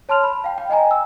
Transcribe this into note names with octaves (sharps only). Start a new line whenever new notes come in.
C#5 A5 C6 F6 F7
B5
F5 G5
G5
D#5 G5 G#5 A#5
E6